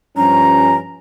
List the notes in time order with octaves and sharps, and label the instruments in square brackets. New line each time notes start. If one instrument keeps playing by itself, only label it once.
[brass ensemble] G2 F3 C#4 [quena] A#5